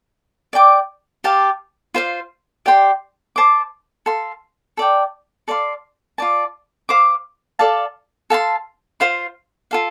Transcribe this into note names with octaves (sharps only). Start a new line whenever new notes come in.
D5 G5 D6
G4 F5 A5
F4 C5 F5
G4 D5 G5 C6
C5 A5 D6
A4 F5 C6
A4 D5 G5
A4 D5 F5 C6
F4 D5 A5
C5 F5 D6
A4 D5 F5 A5
A4 F5 A5 C6
F4 C5 F5 C6
F4 A4 F5